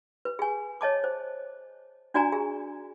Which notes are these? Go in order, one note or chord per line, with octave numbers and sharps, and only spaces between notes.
B4
G#4 G#5
C#5 D#5 A5 D6
C5
D4 F#4 D5 G#5 A#5
G#4